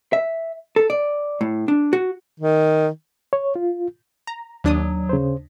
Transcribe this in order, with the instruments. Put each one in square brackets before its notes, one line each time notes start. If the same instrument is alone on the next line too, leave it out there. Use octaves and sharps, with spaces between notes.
[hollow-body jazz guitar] E5
A4
D5
A2
D4
F#4
[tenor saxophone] D#3
[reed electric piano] C#5
F4
[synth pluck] A#5
[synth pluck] D#2 D4 D#6 [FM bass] F#3
[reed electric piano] C#3 C5